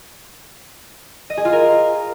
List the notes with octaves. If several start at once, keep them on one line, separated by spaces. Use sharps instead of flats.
D#5
G#4
F4
A#4